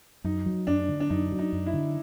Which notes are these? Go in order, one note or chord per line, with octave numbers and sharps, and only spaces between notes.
F#2 D#4
F#3
F#2 D4
D3
D4
F#2 D#4
F#3
D#4
F#2
E4
D3